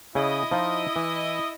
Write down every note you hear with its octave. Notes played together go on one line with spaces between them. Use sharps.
C#3 E4 G#4 D#5
F3 D#4 F4
E3